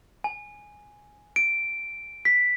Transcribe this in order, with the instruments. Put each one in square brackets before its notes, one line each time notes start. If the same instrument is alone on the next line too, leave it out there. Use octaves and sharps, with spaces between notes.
[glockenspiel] G#5
D7
B6